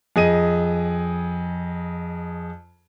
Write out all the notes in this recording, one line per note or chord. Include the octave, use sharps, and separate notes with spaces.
F2 G#4 D#5 D#7